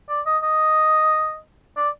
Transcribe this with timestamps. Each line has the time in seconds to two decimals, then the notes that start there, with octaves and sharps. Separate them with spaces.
0.09 D5
0.26 D#5
0.43 D#5
1.77 D5